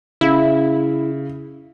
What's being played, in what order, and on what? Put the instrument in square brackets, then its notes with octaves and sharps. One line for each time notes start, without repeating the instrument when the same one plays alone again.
[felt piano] C#3 [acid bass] E4